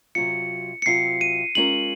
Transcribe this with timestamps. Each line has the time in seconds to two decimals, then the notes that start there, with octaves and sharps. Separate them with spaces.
0.15 C3 F#3 C4 F4 C#7
0.82 C#7
0.86 C3 F#3 C4 F4 C7
1.21 D#7
1.55 G#3 C#4 F4 A#4 F#7